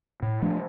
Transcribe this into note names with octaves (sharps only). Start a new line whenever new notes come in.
A2
F3 A3 D4